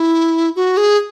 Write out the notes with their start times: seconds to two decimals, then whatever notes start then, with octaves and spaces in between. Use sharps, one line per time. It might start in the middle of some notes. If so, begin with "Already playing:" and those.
Already playing: E4
0.56 F#4
0.77 G#4